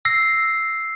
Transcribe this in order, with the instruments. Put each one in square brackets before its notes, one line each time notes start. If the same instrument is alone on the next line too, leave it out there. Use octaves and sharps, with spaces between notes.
[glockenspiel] E6 A#6 C7